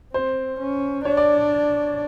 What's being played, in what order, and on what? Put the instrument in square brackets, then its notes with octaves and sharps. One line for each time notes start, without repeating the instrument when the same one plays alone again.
[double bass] C4 [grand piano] C5
[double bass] C#4
[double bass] D4 [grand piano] C#5
[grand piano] D5